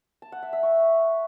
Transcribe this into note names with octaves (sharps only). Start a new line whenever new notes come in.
A5
F#5
E5
E5
C#6